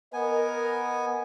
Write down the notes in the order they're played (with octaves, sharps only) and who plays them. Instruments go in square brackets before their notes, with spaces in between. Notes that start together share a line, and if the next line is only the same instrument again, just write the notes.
[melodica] B3 G#5 [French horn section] A#4 D#5